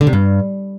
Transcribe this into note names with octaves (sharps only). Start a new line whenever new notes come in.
D3
C3
G2